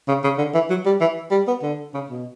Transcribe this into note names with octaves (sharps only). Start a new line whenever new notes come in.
C#3
C#3
D3
E3
F#3
G3
E3
G3
B3
D3
C#3
B2